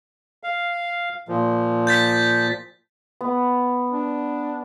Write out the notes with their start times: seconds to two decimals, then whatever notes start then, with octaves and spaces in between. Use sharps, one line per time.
0.43 F5
1.29 A#2 F3
1.87 G6 A6 B6
3.21 B3
3.91 D4